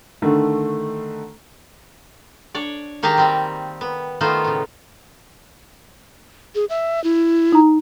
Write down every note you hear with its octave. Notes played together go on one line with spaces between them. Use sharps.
D3 D#3 A3
D4 C#5 D5
D#3 A#3 G4 G#4 A5 A#5
G3 C4
B3
D#3 A3 B3 D#4 F4 C5
A2 C#3
G#4
E5
E4
D#4 A#5